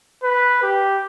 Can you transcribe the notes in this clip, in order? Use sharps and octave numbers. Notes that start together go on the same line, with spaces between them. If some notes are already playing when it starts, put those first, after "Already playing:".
B4
G4